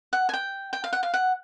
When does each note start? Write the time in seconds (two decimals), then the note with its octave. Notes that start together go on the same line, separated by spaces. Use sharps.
0.13 F#5
0.29 G#5
0.33 G5
0.73 G5
0.84 F5
0.93 F#5
1.03 F5
1.14 F#5